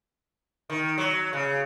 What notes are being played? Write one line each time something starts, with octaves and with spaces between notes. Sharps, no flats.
D#3
F#3
C#3